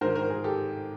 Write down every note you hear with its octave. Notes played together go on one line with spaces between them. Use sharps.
G#2 D#3 A#4 C5
A#4 C5
G#4 A#4
G4 A4